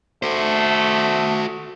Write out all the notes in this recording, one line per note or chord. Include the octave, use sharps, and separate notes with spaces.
A3 F#4 C5